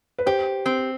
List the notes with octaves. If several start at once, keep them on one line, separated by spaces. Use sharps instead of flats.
B4
G4 C5
C4